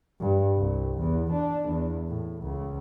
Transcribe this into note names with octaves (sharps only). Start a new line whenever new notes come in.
G2
C2
E2
D4
E2
A2
C#2